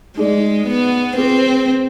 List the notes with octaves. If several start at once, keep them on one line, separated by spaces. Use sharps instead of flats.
G#3 D#4 G#4 D5
B3
C4 F4 G#4 B4